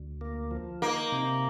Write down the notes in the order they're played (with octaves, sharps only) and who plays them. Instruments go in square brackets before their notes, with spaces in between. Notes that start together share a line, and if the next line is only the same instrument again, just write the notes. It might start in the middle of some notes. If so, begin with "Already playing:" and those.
Already playing: [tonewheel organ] D2
A#3
F3
[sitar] A#3 [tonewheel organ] D#4
[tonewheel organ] C3